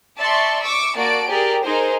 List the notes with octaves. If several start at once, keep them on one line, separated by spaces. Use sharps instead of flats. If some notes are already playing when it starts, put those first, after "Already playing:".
D5 E5 A5 C6 C#6
C#6 D6 E6
A#3 F#4 D5 A5 D7
G4 G#4 A#4 D5
D#4 G#4 A#4 C5